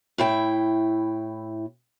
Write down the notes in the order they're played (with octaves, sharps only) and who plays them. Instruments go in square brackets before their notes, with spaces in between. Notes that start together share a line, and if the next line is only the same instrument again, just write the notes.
[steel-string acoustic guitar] A2 E4 G5